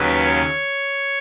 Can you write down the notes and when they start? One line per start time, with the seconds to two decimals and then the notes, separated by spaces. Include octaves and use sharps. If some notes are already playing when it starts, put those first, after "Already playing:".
Already playing: D#2 C#3 F#3 B4
0.24 C#5